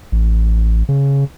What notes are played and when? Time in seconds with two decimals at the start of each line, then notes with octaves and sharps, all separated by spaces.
0.12 A1
0.89 C#3